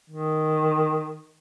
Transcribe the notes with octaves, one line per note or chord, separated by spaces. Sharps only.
D#3